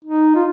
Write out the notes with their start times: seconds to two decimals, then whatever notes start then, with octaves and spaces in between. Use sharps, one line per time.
0.05 D#4
0.35 F4